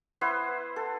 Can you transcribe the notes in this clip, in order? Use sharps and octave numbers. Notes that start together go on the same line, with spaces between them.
B3 E4 B4 C5
A4